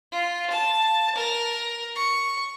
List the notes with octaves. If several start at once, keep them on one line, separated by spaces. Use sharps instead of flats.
F4
A5
A#4
C#6